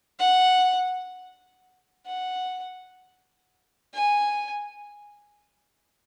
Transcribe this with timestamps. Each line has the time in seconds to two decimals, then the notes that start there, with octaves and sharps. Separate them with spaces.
0.19 F#5
2.06 F#5
3.94 G#5